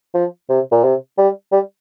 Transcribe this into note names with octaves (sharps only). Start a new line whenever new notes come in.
F3
C3
A#2
C3
G3
G3